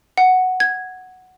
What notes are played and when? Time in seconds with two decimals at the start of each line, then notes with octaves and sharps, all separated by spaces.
0.18 F#5
0.60 G#6